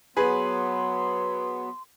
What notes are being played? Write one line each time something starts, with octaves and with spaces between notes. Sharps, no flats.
F#3 B3 G#4 B4 C6